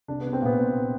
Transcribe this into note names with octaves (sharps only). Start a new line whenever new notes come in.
C2 D4
C2 B3
C4
A#2 B3
A#2